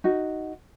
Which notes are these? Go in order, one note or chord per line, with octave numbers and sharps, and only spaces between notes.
D#4 F#4